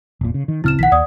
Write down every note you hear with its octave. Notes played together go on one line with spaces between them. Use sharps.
E1 A#2
C#3
D#3
D1 C#3 C4 E4 F6 E7
A#1 D#3 F#5 B6
D#2 D5 D#6